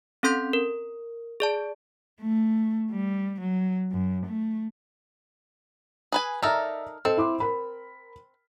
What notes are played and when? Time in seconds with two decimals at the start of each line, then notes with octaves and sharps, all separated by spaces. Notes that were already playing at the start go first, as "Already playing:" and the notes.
0.23 C4 C#4 A4 C6 G6 B6
0.53 A#4
1.40 G#4 D5 A5
2.21 A3
2.92 G3
3.40 F#3
3.92 F#2
4.26 A3
6.12 G#4 B4 G#5
6.43 D#4 A4 A#4 D5 E5 F6
7.05 C4 A4 D#5
7.17 E4 C6 D6
7.40 A#4 B5